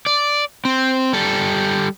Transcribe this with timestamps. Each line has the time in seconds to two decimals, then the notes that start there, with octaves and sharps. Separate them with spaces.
0.06 D5
0.65 C4
1.13 G3 A4